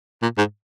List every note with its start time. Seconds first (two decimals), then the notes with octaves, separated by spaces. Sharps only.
0.22 A#2
0.38 G#2